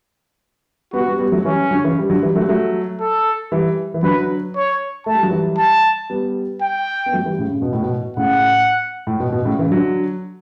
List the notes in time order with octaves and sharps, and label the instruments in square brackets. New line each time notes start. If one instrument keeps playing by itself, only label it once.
[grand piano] G3 B3 [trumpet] F#4
[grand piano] G3 B3
G3 B3
F#3 A3
[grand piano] E3 G3 [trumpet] C#4
[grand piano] D3 F#3
C#3 E3
G3
D3 F#3
E3 G3
F#3 A3
G3
F#3 A3
[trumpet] A4
[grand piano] E3 G3
E3
[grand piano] D3 F#3 [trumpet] B4
[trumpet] C#5
[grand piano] A3 [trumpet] A5
[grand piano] G3
F#3
E3 G3
[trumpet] A5
[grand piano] G3 B3
[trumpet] G5
[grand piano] B3
F#3 A3
E3 G3
A2 C#3
C#3
B2
A2
B2
[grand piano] A2 C#3 [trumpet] F#5
[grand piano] A2
B2
B2
A2 C#3
C#3 E3
D3 F#3